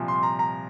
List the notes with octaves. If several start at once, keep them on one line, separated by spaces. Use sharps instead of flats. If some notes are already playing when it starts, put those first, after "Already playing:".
Already playing: C2 A#2 F3
C6
A#5
A#5